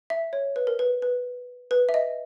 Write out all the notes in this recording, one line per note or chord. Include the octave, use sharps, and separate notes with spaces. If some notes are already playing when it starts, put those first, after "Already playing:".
E5
C#5
B4
A#4
B4
B4
B4
E5
D#5